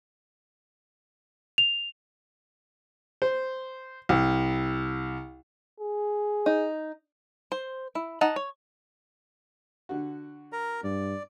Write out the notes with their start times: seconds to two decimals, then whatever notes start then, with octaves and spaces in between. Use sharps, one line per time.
1.58 F7
3.22 C5
4.09 C2
5.80 G#4
6.46 D#4
7.52 C5
7.95 E4
8.21 D#4 F#5 A5
8.36 C#5
9.89 D3 F#4
10.53 A#4 A#5
10.84 G2 D5